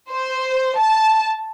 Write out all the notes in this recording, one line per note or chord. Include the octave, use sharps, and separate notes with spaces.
C5
A5